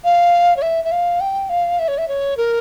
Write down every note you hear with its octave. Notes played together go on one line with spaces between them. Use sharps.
F5
C#5
E5
E5
F5
G5
F5
E5
C#5
E5
C#5
A#4